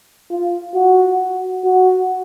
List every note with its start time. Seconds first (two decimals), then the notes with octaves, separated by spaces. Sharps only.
0.30 F4
0.74 F#4
1.65 F#4